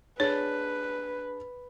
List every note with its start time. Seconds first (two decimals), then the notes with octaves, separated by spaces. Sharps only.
0.20 D4 G#4 B4 C#5